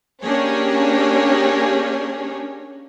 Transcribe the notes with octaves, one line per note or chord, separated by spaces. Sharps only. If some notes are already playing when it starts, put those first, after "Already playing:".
A#3 C#4 D4 G4 G#4 C#5